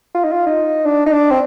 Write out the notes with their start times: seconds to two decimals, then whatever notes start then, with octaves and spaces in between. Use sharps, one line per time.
0.15 F4
0.24 D#4
0.32 F4
0.47 D#4
0.86 D4
1.06 D#4
1.13 D4
1.31 C4